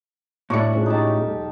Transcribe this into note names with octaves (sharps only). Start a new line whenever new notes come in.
A2 D4 F#4 C#6 C#7
G#3 C#4 F4
D#4 G4 A5
E1 B1